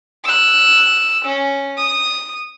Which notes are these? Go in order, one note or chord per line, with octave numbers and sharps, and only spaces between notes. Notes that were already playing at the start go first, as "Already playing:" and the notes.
E6 F#6
C#4
D#6